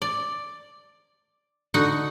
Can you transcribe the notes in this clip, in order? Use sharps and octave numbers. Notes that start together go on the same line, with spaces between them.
D5
D3 D#4 F#4 F#5